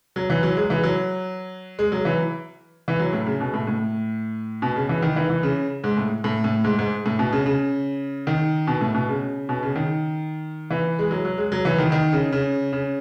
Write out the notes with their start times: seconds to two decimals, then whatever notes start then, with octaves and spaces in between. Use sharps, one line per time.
0.16 F#3
0.30 E3
0.43 F#3
0.57 G#3
0.70 E3
0.83 F#3
1.79 G#3
1.92 F#3
2.05 E3
2.88 E3
3.00 F#3
3.13 A2
3.26 C#3
3.41 B2
3.54 A2
3.67 A2
4.62 B2
4.76 C#3
4.89 E3
5.02 D#3
5.16 E3
5.30 E3
5.43 C#3
5.84 G#2
5.97 A2
6.24 A2
6.44 A2
6.64 G#2
6.79 G#2
7.06 A2
7.19 B2
7.32 C#3
7.46 C#3
8.27 D#3
8.67 B2
8.81 A2
8.95 B2
9.08 C#3
9.49 B2
9.63 C#3
9.76 D#3
10.71 E3
10.99 G#3
11.11 F#3
11.25 F#3
11.38 G#3
11.52 F#3
11.65 E3
11.78 D#3
11.92 D#3
12.12 C#3
12.32 C#3
12.73 C#3